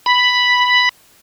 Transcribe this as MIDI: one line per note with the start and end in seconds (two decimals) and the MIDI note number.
0.06 0.89 83